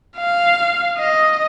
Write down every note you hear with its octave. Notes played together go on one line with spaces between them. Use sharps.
F5
D#5